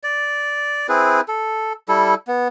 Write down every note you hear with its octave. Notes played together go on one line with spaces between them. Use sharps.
D5
C4 E4 G#4 B4
A4
G3 E4 A4
B3